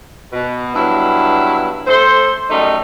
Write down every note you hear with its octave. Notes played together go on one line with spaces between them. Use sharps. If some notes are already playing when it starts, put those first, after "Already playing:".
B2
G2 B2 F#3 E4
A3 A4 C5
F#2 G3 A3 D#4